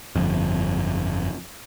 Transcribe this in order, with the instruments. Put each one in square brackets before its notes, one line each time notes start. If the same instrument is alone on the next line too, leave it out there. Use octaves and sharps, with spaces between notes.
[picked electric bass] G1 F2